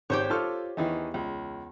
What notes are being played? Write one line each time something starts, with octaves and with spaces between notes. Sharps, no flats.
G#1 G4 C5 C#5
F4 A4 C#6 F6
E2 D#3 E3 D#4
C#2